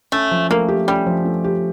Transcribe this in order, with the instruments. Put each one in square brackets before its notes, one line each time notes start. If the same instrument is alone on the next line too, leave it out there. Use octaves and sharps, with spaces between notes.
[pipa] A3 [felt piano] C#4
[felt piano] F3
[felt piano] A3 [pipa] A#3
[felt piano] G4
[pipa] G3 [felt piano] C#4
[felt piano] F3
A3
G4